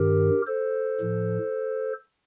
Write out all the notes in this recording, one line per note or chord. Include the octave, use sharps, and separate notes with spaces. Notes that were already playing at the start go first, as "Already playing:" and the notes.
Already playing: G2 D#3 G4 A#4
A4 C5
A2 F3